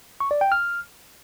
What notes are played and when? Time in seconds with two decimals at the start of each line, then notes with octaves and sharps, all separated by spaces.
0.20 C#6
0.31 D5
0.41 G5
0.52 F6